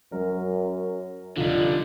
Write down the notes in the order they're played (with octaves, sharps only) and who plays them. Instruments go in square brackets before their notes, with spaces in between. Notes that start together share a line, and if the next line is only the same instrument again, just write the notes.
[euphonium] F#2 [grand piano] F#3 A#4
[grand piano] F1 D#4 [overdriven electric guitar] D3 G3 [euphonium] F4